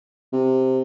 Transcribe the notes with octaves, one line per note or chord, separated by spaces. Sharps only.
C3